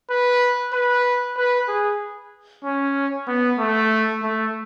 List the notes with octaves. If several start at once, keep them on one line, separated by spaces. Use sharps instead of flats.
B4
B4
B4
G#4
C#4
B3
A3
A3